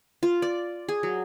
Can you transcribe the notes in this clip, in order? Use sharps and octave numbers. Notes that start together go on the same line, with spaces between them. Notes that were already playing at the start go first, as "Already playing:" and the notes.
F4
D5
G#4
F#3